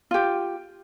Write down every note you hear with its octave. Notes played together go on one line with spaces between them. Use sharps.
F4 G4